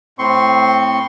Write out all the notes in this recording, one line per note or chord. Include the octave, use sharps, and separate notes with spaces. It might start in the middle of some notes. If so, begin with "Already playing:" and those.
A2 C4 C6 C#6